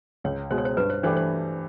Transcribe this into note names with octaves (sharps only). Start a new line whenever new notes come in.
C#2 C#5
B2 G#3 C5
C#5
C5
G2 B4
C5
E3 A3 D4 G4 C5
C5